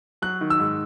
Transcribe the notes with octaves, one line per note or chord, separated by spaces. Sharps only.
F#3 F#6
D#3
E6
G#2